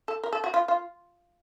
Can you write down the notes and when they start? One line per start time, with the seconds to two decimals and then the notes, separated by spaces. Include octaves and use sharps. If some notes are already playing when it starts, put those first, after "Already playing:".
0.08 A4
0.24 A#4
0.33 A4
0.44 F#4
0.54 F4
0.68 F4